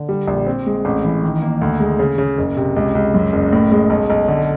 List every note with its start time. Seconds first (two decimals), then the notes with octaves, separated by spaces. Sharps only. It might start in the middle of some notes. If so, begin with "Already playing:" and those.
Already playing: D3
0.09 G3
0.28 A#1
0.46 C4
0.66 G#3
0.85 A1
1.05 E3
1.23 D#3
1.42 A#3
1.61 D2
1.80 G#3
1.99 C#3
2.18 C#3
2.38 F#1
2.57 C3
2.76 C#2
2.95 C#2
3.14 F#2
3.33 F#1
3.53 A2
3.72 G#3
3.90 B1
4.10 B1
4.28 D3